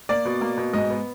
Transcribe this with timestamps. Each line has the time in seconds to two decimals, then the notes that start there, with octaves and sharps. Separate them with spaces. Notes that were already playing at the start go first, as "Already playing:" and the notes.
0.09 A#3 D5
0.25 B2
0.41 A#3
0.58 B2
0.73 G#2 D#5
0.90 B3